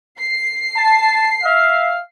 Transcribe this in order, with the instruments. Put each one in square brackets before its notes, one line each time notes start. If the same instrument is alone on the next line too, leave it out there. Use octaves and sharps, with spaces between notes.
[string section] C7
[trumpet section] A5
E5 F5